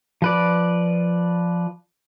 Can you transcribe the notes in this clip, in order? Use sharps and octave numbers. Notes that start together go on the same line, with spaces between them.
F3 B4 D5